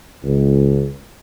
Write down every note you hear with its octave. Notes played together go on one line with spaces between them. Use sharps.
C#2